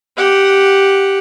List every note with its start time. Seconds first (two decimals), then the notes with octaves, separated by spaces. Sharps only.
0.17 G4 F#5